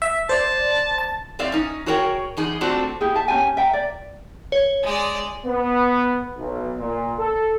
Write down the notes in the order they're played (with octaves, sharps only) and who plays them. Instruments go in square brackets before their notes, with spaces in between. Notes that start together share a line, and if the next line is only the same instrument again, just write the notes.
[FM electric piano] E5
[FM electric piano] C5 D5 [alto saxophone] A5
[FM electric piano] A5
[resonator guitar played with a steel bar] C4 C#5 D5 E5 F5
C#4 D#4
F#4 G#4 A#4 C#5 F#5 G5
E2 D#4 G#4
A3 C4 D4 F4 F#4 A4
[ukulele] E4 G4 G#4
E5 A5
C#4 F#4 G4 G#5
E5 G5 A#5
D5
[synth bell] C#5
[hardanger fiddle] G#3 D5
[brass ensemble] B3
B1
A#2
A4